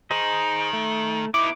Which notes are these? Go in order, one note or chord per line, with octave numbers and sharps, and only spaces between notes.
D#3 G#4 C5 D#5
A3
B3 D#4 E4 D6